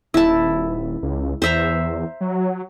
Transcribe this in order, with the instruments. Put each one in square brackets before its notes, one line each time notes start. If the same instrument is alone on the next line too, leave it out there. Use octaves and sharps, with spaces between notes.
[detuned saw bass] D#1 [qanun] E4 A5
[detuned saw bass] C#2
[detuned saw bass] E2 [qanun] C5 E5 A#5
[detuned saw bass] F#3